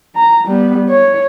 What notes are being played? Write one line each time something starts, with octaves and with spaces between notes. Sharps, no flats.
A#5
G3 B3
C#5